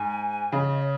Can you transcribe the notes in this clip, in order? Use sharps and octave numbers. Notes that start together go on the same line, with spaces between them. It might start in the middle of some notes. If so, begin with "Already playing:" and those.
Already playing: G#2 G#5
C#3 D#5
C#5